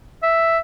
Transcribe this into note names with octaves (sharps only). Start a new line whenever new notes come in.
E5